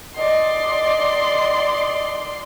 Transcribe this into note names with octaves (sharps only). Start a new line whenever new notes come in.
D5 D#5 C6